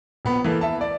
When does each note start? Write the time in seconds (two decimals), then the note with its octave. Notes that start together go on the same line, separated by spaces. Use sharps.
0.25 A#1 B3 B5
0.44 E3 A#3 A4
0.61 E5 A5
0.81 D5